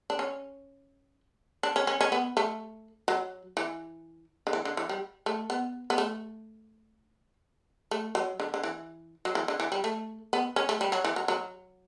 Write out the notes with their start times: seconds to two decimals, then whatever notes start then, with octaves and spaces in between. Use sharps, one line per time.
0.10 D4
0.19 C#4
1.63 D4
1.76 C#4
1.87 C#4
2.01 C#4
2.12 B3
2.37 A3
3.08 F#3
3.57 E3
4.47 D3
4.53 E3
4.65 D3
4.77 E3
4.89 G3
5.26 A3
5.50 B3
5.90 B3
5.98 A3
7.91 A3
8.15 F#3
8.40 D3
8.54 D3
8.63 E3
9.25 F#3
9.35 E3
9.48 D3
9.60 E3
9.72 G3
9.84 A3
10.33 B3
10.56 C#4
10.69 A3
10.81 G3
10.92 F#3
11.04 E3
11.16 F#3
11.28 F#3